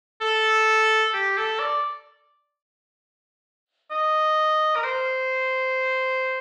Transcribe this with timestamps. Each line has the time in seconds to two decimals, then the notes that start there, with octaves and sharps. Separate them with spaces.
0.21 A4
1.14 G4
1.38 A4
1.60 D5
3.91 D#5
4.76 A#4
4.84 C5